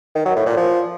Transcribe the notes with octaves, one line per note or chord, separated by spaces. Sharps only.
D#3
F#3
A2
A#2
F3